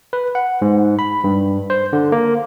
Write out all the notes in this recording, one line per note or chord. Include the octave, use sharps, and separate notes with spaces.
B4
F#5
G#2
B5
G2
C5
D3
A#3